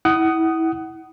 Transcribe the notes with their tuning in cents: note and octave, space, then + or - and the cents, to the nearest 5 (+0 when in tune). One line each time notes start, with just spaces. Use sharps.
E4 -20 F#5 +25 D#6 +0